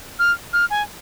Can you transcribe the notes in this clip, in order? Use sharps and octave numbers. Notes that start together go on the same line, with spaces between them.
F6
F6
G#5